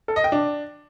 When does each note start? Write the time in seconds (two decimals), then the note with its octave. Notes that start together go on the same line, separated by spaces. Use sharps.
0.08 A4
0.16 D#5
0.24 G5
0.32 D4